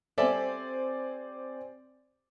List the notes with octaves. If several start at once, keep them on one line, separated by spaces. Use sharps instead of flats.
G3 C4 A4 C5 D5 E5 G#5